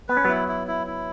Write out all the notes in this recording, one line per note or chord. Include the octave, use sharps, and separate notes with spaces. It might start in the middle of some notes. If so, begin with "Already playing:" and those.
B3 B4
C#4
F#3 B3 E4
E4
E4
E4